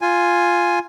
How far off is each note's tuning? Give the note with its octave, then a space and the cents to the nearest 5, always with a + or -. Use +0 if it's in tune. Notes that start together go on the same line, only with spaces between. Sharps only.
F4 +0 G#5 +0